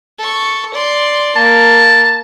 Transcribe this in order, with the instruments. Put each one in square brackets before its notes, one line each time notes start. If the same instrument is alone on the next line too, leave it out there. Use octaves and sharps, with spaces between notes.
[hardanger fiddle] A4 C#6
D5 C6
[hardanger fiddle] A#3 [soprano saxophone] A5